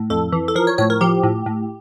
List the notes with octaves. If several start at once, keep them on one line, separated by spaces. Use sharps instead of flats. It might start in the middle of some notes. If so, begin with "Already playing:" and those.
Already playing: A2
F2 A4
E3
A4
F3 A#4
C#5
A2 C#5
A#4
F3 G4
A2
A2